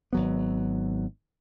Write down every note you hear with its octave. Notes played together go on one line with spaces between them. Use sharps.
G#1 F#3 B3